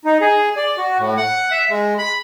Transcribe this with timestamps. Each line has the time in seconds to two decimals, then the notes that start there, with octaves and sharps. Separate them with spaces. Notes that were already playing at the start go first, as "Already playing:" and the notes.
0.05 D#4
0.21 G#4
0.57 D5
0.77 F#4
0.98 A2
1.17 F#5
1.51 E5
1.70 G#3
1.98 B5